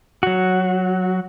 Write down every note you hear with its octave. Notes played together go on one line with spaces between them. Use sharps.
F#3 F#4